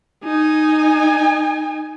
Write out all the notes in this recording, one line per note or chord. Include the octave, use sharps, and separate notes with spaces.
D#4 G#5